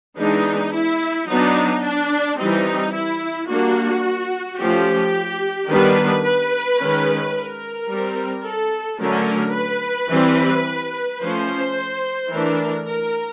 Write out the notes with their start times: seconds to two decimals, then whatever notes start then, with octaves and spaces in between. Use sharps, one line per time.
0.18 E3 G#3 B3 D4 D#4
0.73 E4
1.28 F#3 B3 D4 D#4
1.83 D4
2.38 E3 G3 C4 D#4
2.93 E4
3.48 G3 A#3 D4 F#4
4.58 F3 A3 C#4 G4
5.69 D#3 G3 B3 D4 B4
6.24 B4
6.79 D#3 G#3 C#4
7.34 A#4
7.90 G3 C4
8.45 A4
9.00 D3 F#3 A3 C#4 A#4
9.54 B4
10.10 E3 G3 C4
11.20 F3 A3 C#4 C5
12.30 E3 A3 D4 A#4
12.86 A#4